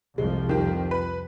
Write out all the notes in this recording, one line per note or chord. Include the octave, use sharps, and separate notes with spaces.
C2 F2 F3 G#3
D#3 G4
B4